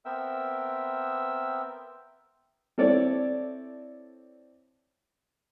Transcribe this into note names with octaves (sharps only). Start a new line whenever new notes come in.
B3 C4 A#4 E5 G5 E6
C4 E4 A4 C#5 D5